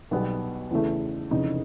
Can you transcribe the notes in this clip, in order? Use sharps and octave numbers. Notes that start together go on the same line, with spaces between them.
B1 B2 G3 B3
E2 C#3 E3 A3
F1 E2 C#3 D#4